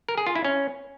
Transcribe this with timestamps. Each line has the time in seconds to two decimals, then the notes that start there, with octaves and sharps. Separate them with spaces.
0.09 A#4
0.18 G#4
0.27 F4
0.36 E4
0.45 C#4